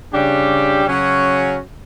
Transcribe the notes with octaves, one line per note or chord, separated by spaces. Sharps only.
C#3 G3 D4 G4
C#3 F#3 C#4 F#4